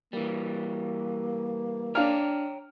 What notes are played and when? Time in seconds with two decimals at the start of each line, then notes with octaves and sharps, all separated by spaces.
0.13 E3 G3 A#3
1.95 D4 C#5 F5 G5 A#5 F6